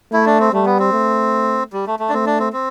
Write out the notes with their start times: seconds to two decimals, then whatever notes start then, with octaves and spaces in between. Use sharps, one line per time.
0.12 A3 E4
0.26 D4
0.40 C4
0.53 G3 A3
0.66 B3
0.79 C4
0.92 A3
1.73 G3
1.87 A3
2.00 A3
2.09 D4
2.13 A3 C4
2.26 D4
2.39 C4
2.53 C4